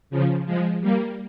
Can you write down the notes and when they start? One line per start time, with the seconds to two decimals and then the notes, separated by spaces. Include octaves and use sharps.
0.10 C#3 F3
0.46 F3 G#3
0.80 G3 A#3